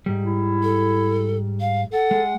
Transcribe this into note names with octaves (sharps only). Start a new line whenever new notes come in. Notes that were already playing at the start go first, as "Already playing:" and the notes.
G#2 G3
E4
A4
F5
A4 F#5
G#3